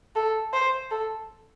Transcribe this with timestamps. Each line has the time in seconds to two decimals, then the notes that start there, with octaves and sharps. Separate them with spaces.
0.16 A4
0.53 C5
0.91 A4